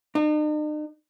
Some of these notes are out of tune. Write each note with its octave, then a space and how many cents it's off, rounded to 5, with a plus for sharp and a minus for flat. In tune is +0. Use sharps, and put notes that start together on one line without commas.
D#4 -45